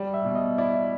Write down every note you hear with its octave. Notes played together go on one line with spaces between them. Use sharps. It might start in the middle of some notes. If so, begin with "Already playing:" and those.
Already playing: G3
E5
B2
D#5
E4 D5